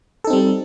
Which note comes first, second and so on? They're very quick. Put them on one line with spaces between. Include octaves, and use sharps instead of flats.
A4 D#4 C4 G3